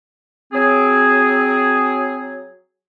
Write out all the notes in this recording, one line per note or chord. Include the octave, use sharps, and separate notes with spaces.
F#3 C4 G#4